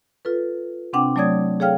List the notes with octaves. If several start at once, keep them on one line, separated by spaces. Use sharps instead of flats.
F4 A4 B4
C3 C4 D4 F#5 G5 D6
F#3 A3 C#5 D5 D#6 G#6
G#4 A4 C#5 F5 G5 F6